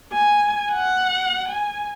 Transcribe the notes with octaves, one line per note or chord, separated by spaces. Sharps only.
G#5
F#5
G#5